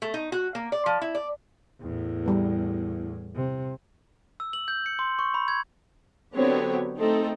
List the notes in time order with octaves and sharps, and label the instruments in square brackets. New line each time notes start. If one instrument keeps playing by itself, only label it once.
[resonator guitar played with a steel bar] A3
D#4
F#4
A#3
D5
F3
E4
D5
[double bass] E2 A2
[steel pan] G3 B3
[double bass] C3
[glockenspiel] E6
F#7
G6
C#7
C6
C#6
B5
G#6
[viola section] D3 F#3 B3 C4 G4 C#5
A3 C4 D#4 A4